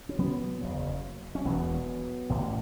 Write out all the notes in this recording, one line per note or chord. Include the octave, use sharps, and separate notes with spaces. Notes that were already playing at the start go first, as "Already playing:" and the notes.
C#4
F#3 B3
F#1 E2 C#3
C#4
E1 E2 B2 F#3 B3
A1 A2